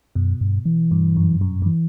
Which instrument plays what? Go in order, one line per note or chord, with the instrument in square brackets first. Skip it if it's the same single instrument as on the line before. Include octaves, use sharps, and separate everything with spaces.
[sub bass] F#2 [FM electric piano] B2
[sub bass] G2
E3
[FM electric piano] G2
F#2
F#2
G2
[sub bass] E3